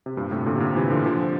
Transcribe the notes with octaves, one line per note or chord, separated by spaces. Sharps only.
C3
G2 A#2
A2 C3
A#2 D3
C3
A#2 D3
C3 E3
D3 F3
D3 F3